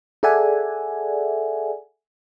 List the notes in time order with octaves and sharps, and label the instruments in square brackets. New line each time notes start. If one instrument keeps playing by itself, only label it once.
[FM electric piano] G#4 A4 D5 E5 F#5 G#5